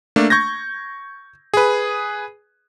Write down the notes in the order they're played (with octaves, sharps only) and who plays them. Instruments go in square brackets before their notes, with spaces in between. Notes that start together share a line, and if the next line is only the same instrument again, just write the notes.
[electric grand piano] A3 A#3 D4
C#6 G6 G#6 A#6
G#4 B4